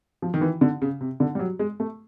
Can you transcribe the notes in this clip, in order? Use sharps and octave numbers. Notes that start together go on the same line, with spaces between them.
F3
D#3
E3
D3
C#3
C3
D3
G3
F#3
G#3
A3